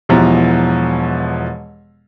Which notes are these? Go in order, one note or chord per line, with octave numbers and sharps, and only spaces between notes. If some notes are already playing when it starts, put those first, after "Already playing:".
E1 B2 E3 F3 G4 A#5